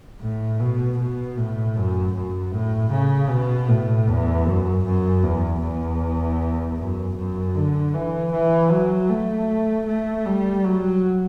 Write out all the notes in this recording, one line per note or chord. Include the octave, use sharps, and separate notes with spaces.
A2
B2
B2
A2
F#2
F#2
A2
C#3
B2
A2
E2
F#2
F#2
E2
E2
F#2
F#2
D3
E3
E3
F#3
A3
A3
G3
F#3